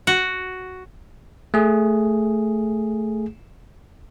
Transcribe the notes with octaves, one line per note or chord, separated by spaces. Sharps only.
F#4
A3 G#4